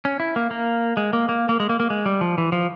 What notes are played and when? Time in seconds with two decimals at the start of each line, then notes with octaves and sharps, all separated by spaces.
0.05 C#4
0.20 E4
0.36 A#3
0.51 A#3
0.97 G#3
1.13 A#3
1.29 A#3
1.49 A#3
1.60 G#3
1.69 A#3
1.80 A#3
1.90 G#3
2.06 G3
2.21 F3
2.38 E3
2.52 F3